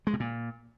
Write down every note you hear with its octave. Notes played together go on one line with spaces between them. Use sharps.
G#3
B2
A#2